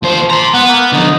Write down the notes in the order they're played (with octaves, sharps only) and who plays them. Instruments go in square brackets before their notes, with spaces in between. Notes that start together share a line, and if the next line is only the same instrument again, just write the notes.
[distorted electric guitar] D#2 C5 [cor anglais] F3
[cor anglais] C5 [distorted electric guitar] A#5 C6
[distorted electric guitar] B3 [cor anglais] F#5
[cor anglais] A#3
[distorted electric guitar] D3 F3 [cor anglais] D#4